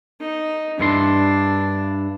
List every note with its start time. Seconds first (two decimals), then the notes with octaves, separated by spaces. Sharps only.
0.21 D#4
0.79 G2 D4 E4 C6